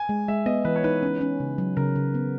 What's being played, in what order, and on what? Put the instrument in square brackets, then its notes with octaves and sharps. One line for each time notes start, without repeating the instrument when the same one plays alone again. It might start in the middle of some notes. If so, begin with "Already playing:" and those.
Already playing: [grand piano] G#5
[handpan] G#3
[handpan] G#3 [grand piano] E5
[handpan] B3 [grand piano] D#5
[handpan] E3 [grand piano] B4
[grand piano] C#5
[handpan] D#4 [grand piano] B4
[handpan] C#4
C#4
C#3
F#3
[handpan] C#3 [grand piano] A#4
[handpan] C#3
B3